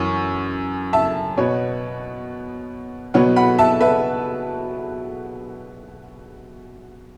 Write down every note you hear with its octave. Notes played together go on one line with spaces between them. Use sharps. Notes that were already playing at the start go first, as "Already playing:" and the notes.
Already playing: F#2 E3 C#4 C#6
E5 A5
B2 B3 C#5
B2 F#3 B3 C#5 F#5
F#5 B5
E5 A5
B4 E5